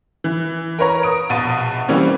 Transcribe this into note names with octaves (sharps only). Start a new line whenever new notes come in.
E3
A#4 B4 C#5 A#5
D#6 D7
A#1 B2 A6 D#7
E3 G3 A#3 C4 C#4